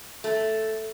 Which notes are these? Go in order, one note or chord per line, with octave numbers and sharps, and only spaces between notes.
A3